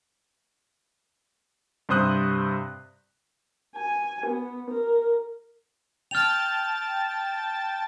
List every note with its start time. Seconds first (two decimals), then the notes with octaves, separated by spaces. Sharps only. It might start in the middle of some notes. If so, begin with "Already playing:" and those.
1.89 G2 C3 C5 D#6 F#6
3.76 G#5
4.26 B3
4.70 A#4
6.11 G5 A5 F6 A6 F7